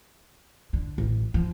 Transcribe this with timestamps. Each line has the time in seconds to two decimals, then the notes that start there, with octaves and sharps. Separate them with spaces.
0.73 D3
0.98 A1
1.34 F3